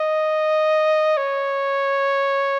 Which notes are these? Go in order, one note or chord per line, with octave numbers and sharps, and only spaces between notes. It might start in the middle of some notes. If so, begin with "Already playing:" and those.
Already playing: D#5
C#5